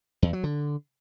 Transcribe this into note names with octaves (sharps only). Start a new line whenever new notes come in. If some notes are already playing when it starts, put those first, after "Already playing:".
E2
F#3
D3